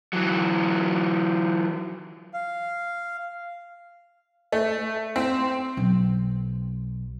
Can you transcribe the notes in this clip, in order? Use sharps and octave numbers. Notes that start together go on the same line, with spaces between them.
E3 F#3
F5
A3
C4
B1